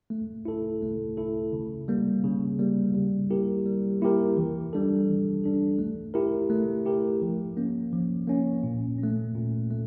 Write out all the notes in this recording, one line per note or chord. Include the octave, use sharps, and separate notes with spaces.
A3
E4 A4
A3
E4 A4
C#3
G3 A#3
C#3
G3 A#3
G3
A#3 E4 G4 A#4
G3
A#3 E4 G4 A#4
E3
G3 D4 A4
E3
G3 D4 A4
A3
E4 G4 A#4
A3
E4 G4 A#4
F3
A#3 C#4
F3
A#3 C#4
A#2
C#4
A3
A#2
A3